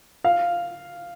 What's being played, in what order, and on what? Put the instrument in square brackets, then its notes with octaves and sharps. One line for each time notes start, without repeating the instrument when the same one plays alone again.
[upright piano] F5